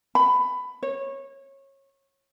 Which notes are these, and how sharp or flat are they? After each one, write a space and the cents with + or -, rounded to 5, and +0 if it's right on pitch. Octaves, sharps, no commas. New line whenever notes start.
B5 +15
C#5 -20